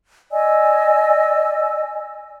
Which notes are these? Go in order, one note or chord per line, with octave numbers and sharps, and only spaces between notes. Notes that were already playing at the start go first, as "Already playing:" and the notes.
D5 D#5 G#5 E6